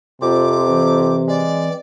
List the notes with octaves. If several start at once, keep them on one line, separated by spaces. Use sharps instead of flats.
F2 C3 C4 F4 D6
E3 C4
G#3 D5